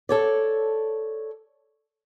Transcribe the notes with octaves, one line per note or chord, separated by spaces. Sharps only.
A4 C#5 D5